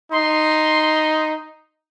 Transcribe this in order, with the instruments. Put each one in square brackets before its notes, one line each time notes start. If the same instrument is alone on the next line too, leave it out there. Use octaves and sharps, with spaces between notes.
[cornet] D#4 [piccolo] C6